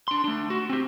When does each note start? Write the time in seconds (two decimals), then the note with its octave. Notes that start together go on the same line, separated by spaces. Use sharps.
0.08 D4 C6
0.24 A3 D4
0.50 F#4
0.70 C4 G4